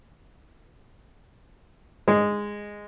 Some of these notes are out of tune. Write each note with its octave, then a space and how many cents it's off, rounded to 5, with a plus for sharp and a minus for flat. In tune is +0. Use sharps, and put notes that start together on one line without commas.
G#3 -10